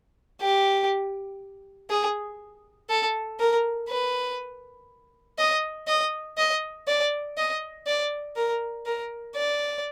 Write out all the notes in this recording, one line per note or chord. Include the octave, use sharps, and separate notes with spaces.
G4
G#4
A4
A#4
B4
D#5
D#5
D#5
D5
D#5
D5
A#4
A#4
D5